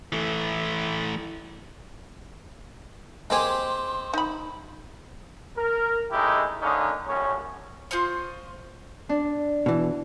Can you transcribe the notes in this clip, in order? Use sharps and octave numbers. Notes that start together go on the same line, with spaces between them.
E3 A3
G#3 A#3 C4 G4 G#4 C6
D#4 B5
A#4
G#3 A3 C#4 D#4 E4 G4
D3 A#3 C#4 D#4
A#1 F#2 A2 C#4
F4 C5 D#5 C#6
D4
B2 E3